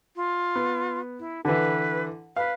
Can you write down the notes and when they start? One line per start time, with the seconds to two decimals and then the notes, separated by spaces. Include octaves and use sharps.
0.16 F4
0.56 B3
1.19 E4
1.45 D3 E3 B4
2.36 B4 F5